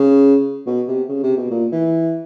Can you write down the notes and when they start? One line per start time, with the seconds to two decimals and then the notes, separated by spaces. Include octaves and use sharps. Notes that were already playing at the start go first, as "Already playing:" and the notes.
Already playing: C#3
0.67 B2
0.88 C3
1.09 C#3
1.23 C3
1.37 B2
1.51 A#2
1.72 E3